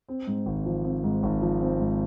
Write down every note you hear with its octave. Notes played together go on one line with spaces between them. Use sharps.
C4
G#2
G#1
F3
C4
G#2
G#1
F3
C4
G#2